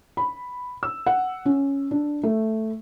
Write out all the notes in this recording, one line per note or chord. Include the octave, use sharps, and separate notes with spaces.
B5
E6
F#5
C#4
D4
A3